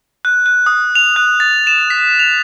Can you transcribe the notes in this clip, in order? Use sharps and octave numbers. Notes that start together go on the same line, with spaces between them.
F#6
F#6
D#6
F7
F#6
A6
E7
B6
F7